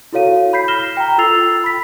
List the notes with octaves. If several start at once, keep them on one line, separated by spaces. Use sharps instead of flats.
E4 F#4 A4 C#5 F5 D#7
B5 G6 B6 C7
F6 A#6 E7 G7
G5 A#5
F4 A4 E6 A6 C7 F7
B5 B6